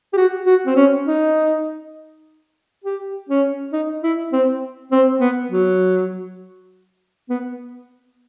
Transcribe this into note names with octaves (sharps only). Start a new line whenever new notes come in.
G4
F#4
F#4
C4
C#4
D#4
G4
C#4
D#4
E4
C4
C4
B3
F#3
B3